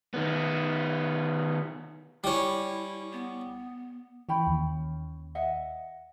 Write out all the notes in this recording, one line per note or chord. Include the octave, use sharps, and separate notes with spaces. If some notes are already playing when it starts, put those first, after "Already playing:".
D#3 B3
G3 C#4 E4
B3
E3 C#4 G5 B5
D#2
D#5 E5 F#5